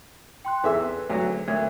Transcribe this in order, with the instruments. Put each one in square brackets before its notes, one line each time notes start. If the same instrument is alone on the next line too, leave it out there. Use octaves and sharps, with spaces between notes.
[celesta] G5 C6 F#6
[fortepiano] E2 E5 E6 [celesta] G#4 A4 B4
[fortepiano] D2 F#3
[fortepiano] D2 [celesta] A#4 E5 G#6